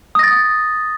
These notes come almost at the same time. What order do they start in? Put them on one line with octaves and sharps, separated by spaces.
D#6 A#6 A6